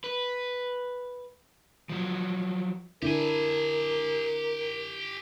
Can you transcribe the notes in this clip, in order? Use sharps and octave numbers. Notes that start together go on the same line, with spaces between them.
B4
F3 F#3
D3 D4 E4 G4 A#4 G#5